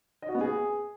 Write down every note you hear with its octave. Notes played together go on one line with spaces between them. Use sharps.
D#5
F#4
B3
G#4